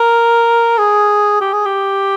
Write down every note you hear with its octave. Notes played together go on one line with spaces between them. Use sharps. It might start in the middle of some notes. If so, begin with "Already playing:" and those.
Already playing: A#4
G#4
G4
G#4
G4